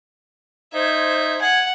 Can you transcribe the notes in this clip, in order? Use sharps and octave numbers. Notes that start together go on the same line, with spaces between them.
D#4 C5 E5 G#6
F#5 G#5